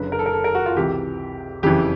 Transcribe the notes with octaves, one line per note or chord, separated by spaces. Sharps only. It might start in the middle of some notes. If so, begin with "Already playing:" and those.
Already playing: F#1 F#2 D3 B4
A#4
A4
A#4
A4
A#4
F#4
F4
C#2 C3 E3 G4
F#1 F2 C#3 E3 G4